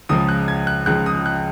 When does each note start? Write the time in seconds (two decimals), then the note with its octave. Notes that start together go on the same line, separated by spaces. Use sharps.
0.09 C#2 C#3 F3 D#6
0.29 F#6
0.48 G#6
0.67 F#6
0.86 C#2 C#3 F3 F#6
1.06 D#6
1.26 F#6